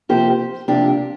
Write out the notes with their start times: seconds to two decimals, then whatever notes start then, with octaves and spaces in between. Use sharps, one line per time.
0.09 C3 F3 A#3 G4 C5
0.68 C3 F3 A#3 D4 G4